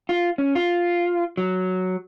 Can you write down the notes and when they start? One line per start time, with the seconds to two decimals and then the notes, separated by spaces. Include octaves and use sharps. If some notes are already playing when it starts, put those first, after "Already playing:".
0.09 F4
0.38 C#4
0.55 F4
1.37 F#3